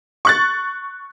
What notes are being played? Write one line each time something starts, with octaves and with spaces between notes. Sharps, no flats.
C#6 F#6 A6